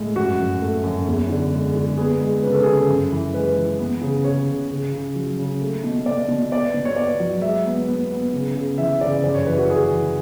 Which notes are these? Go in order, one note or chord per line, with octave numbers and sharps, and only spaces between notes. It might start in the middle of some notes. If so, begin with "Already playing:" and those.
Already playing: A2 G#3
F#2 F#4
F#2
A3
F#2
E2
D3
G#3
D3
B3 G#4
G#3
C#3 B4
A4
C#3 G#4
A4
F#2
E3
G#3 B4
E3
B3
C#3
C#3 C#5
C#3
C#3
C#3
F#3
C#3
A3
B2
B2 D5
B2
B3 D5
B2
C#5
B3 D5
F#3
G#3 E5
B3
B3
B3
C#3
C#3
E3 E5
C#3 D5
F#2 D5
C#5
E3 B4
F#4
E3 G#4
E3